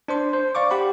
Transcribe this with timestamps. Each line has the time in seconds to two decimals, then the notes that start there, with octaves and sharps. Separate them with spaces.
0.08 D4 C5 C6
0.33 C5
0.55 D5 F5 C#6 D6
0.71 G4 F#5 B5